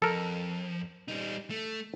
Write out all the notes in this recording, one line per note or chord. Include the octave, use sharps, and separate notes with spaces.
F2 A4 A#4
G3 D#4
A3